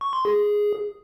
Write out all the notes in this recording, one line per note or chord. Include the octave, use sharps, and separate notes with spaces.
C#6
C6
G#4